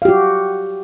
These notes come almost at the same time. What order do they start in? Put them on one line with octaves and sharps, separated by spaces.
F5 G4 F#4